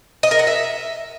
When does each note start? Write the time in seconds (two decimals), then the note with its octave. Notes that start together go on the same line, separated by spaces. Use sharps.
0.23 D#5
0.31 A#4
0.39 F#5
0.47 E5